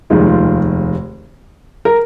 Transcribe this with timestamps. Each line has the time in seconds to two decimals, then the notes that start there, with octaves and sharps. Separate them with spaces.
0.10 F1 D#2 D#3 G#3 F4
0.27 F4
1.85 A#4